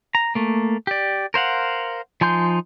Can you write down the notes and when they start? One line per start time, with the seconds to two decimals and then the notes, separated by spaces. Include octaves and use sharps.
0.15 A#5
0.35 A3 A#3
0.87 G4 D5
1.34 A#4 C5 F5 F#5
2.21 F3 D#4 G#5 C6 G6